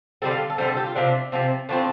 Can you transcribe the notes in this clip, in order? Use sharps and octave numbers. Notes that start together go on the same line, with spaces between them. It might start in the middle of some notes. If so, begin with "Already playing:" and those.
D3 G3 C4 A4
F4
A4
D3 G3 C4 C5
A4
G4
F4
C3 F3 C4 D4
C3 F3 C4
A2 F3 C4 D4